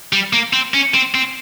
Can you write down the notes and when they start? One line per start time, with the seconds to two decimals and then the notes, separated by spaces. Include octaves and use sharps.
0.13 G3
0.33 A#3
0.53 C4
0.74 C#4
0.94 C4
1.15 C4